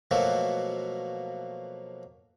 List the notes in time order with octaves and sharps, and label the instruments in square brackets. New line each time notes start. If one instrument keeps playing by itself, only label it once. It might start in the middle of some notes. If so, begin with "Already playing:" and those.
[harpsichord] B2 F3 F#3 A3 A#3